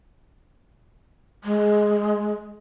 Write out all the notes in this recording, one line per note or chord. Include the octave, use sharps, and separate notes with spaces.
G#3